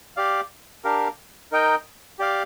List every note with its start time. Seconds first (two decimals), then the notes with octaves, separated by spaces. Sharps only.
0.17 G4 D5 F5
0.84 D4 G4 A#4 F5
1.52 D#4 A#4 D#5 G5
2.19 G4 D5 F5